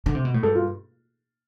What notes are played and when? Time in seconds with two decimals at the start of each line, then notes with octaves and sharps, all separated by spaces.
0.06 D3
0.15 C3
0.25 B2
0.34 A2
0.43 G2 A4
0.55 F4